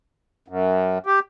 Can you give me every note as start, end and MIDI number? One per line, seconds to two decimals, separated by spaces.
0.48 0.98 42
1.06 1.20 67